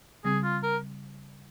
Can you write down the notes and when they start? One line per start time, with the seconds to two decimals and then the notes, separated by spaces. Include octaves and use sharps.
0.24 C#3 G3 C4 G#4
0.44 F4
0.63 A#4